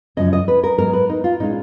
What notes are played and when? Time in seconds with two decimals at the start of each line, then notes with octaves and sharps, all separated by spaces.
0.17 F#2 C#3 F3 C#4 D#5
0.33 D#5
0.48 B4
0.64 A#4
0.78 G#2 F#3 B3 A#4
0.93 B4
1.09 D#4
1.24 F4
1.40 A#2 G#3 C#4 D#4